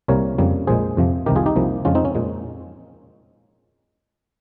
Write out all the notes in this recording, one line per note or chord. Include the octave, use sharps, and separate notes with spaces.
C2 C3 G3 A#3 A#4 C#5
F2 C#3 G3 A#3
A#1 A#2 G#3 G#4 C5
F2 C3 F3
C2 C3 D#3 G4 A#4
F4 G#4
D#4 G4
C2 C3 F3 A#3
F2 C#3 F3 G#3 C#4 F4
C4 D#4
C#4
A#2 G#3